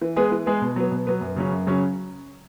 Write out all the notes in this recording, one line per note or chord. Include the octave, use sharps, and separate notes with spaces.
E3
G#3 B3 G#4
E3
G#3 B3 G#4
B2
F#3 B3
B2
F#3 B3
F#2
C#3 F#3 C#4
F#2
C#3 F#3 C#4